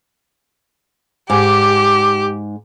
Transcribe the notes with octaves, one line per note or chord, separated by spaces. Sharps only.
G#2 G4 D6